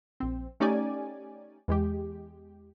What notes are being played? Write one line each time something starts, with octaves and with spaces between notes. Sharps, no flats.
A#1 C4
A3 C#4 D#4 G4 D5 G#5
E2 G#3 G4